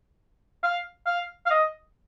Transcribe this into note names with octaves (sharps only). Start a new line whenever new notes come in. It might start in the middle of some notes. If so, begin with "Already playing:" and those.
F5
F5
F5
D#5